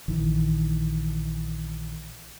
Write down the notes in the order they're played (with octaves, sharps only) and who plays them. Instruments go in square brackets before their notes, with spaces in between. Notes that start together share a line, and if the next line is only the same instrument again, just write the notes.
[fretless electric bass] A#1 D#3 E3